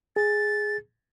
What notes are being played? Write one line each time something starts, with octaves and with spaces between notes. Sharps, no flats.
G#4 A6